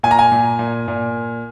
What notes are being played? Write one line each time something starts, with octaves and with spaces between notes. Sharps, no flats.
A#2 G#5
A#5
G#5
A#2
A#2
A#2